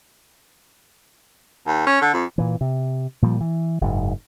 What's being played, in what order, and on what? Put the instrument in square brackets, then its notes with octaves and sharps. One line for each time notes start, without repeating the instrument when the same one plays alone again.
[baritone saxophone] D#2
C#4
D3
F2
[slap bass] A#2 E3
C3
A#2 F3 G3
E3
F#1 G#2